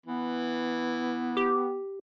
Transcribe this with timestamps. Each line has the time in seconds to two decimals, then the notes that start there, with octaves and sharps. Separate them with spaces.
0.06 E3 B3
1.37 G4